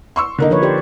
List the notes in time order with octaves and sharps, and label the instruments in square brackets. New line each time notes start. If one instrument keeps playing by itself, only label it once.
[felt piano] C6 C#6 E6
D3 A#3 D#4
[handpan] F3 B4 C#5
G4 C5 D5